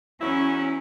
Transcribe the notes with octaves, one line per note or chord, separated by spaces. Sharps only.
E2 F#3 C#4 E4